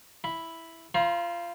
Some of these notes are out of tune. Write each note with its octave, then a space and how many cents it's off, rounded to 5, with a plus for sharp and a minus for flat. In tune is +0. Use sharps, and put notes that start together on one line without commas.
E4 +0 B5 +0
F4 -20 C5 +10 A#5 +40